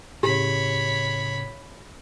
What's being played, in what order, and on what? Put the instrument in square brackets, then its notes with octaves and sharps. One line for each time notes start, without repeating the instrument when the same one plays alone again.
[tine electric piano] A2 C#3 [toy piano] G4 [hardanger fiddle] C#5 B5